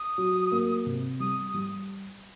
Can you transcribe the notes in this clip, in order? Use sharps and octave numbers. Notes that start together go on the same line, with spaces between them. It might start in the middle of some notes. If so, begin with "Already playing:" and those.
Already playing: D#6
F#3
A#3
C3
G3 D#6
G3